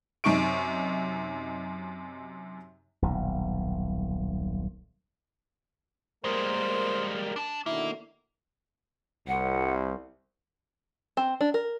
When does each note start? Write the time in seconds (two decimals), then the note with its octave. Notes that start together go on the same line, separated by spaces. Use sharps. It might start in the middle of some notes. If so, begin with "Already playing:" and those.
0.24 F#2 C3 D#4 C#6 D7
3.02 D#1 B1
6.24 G3 G#3 A#3 A#4 C5
7.36 D4 A5
7.66 B2 D3 D#3 A#3 E4
9.28 C2 F#5
11.17 C4
11.41 D4
11.54 A#4